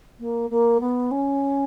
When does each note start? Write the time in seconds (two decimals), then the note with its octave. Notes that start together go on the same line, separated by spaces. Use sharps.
0.19 A#3
0.50 A#3
0.80 B3
1.11 C#4